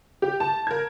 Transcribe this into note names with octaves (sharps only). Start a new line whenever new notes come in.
G4
A5
A#4 G#6